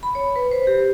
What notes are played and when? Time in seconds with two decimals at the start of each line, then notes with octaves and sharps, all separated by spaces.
0.03 B5
0.15 C#5
0.36 B4
0.51 C5
0.67 G4